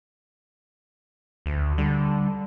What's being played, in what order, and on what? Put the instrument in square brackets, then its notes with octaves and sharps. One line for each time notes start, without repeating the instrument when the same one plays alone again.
[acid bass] D2
[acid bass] D3 [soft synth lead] G3